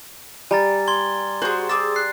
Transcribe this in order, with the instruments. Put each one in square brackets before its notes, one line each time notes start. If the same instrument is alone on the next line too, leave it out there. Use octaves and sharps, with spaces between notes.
[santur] G3 [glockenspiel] G#5 A#5 A6
[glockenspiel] C6 G#6 G7
[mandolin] F#4 G#4 [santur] C5
[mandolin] G#4 D6 E6 [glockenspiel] A6
[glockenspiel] F#6 C7